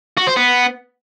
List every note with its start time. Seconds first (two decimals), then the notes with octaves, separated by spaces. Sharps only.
0.17 F#4
0.27 C5
0.36 B3